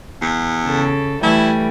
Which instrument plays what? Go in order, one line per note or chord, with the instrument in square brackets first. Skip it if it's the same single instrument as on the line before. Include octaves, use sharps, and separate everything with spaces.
[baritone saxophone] E2 [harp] C7 C#7
[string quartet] C#3 A4
[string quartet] E3 G3 [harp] A3 G#5 [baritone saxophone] E4